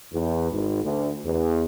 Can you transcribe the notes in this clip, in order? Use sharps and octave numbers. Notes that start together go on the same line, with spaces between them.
E2
G#1
D2
E2